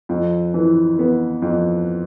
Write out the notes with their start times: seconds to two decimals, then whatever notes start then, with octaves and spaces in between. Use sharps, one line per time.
0.09 F2
0.54 E3
0.99 B3
1.42 F2